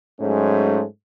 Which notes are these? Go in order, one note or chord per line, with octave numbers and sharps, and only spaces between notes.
G#2 F#3 G#3 A3 C#4